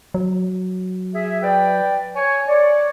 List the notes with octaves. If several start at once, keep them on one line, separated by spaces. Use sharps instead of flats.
F#3
G#4 E5
B4 D5 G5
C#5 G#5
C#5 D5